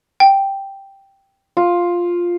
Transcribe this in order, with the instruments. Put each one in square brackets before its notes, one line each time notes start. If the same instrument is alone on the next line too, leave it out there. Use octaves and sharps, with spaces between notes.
[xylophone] G5
[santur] F4